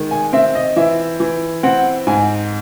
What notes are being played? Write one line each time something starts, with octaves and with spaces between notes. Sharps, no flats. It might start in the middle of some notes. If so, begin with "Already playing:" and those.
Already playing: D#3 G#3
G#5
C4 E5
D#5
E3 E5
E3
C4 F#5
G#2 G#5